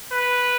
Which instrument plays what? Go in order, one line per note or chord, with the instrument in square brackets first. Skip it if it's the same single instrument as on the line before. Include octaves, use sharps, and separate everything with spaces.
[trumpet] B4